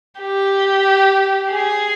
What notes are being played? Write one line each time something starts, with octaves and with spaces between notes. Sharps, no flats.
G4
G#4